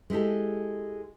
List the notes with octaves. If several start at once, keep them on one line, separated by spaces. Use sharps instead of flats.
G#3 E4 G4 A4